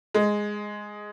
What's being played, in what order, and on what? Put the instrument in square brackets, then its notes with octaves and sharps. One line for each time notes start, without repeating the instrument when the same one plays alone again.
[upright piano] G#3